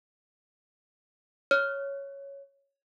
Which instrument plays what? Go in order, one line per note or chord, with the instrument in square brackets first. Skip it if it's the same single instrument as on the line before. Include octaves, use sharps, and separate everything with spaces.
[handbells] C#5 [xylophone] F6